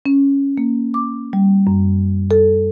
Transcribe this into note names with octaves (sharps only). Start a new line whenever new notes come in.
C#4
A#3
D6
G3
F#2
A4